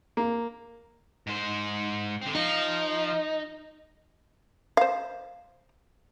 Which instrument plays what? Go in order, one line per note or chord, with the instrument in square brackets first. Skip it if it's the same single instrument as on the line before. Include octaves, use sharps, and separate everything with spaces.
[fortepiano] A#3
[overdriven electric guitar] G#2 C5
D3 C4
[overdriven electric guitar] F3 [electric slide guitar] D#4
[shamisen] C5 F5